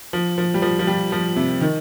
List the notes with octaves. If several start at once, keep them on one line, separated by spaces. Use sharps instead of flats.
F3
F3
G3
F3
F3
G3
F3
C3
D#3